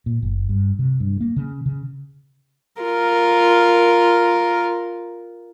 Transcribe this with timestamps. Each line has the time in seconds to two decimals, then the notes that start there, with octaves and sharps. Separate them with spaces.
0.06 A#2
0.23 F#1
0.49 G2
0.79 C3
1.00 G2
1.21 A#3
1.36 C#3
1.66 C#3
2.83 F4 A#4